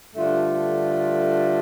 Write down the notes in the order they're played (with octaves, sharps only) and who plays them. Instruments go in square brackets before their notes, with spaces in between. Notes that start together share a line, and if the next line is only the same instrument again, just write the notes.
[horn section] G2 D3 A3 D4 F4